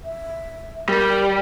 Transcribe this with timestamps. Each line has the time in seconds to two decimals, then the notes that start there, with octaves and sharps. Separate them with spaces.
0.04 E5
0.89 G3 A#4